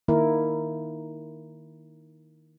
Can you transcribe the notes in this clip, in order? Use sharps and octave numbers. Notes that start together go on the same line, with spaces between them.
D#3 A#3 E4 A#4